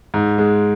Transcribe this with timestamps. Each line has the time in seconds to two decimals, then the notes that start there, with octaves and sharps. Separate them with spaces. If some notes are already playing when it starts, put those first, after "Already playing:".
0.14 G#2
0.38 G#3